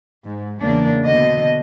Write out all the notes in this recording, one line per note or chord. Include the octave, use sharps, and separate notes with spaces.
G#2
E2 C#3 A#3 D4
B2 D3 D#5